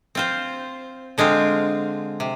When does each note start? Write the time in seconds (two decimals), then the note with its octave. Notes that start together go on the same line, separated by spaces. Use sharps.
0.15 C4 F4 C5
1.18 D3 G#3 C4 F4
2.20 C3